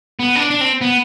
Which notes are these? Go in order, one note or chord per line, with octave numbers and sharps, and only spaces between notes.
B3
D4
D4
C4
B3